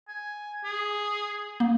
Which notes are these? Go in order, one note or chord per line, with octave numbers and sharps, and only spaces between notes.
G#5
G#4
A#3